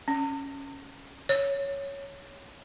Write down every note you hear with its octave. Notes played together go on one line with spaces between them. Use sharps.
C#4
C#5